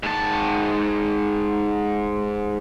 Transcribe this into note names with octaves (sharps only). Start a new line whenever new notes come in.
G#2 A5